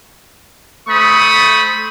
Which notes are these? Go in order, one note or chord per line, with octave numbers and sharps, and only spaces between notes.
A3 C5 B5 C#6 D#6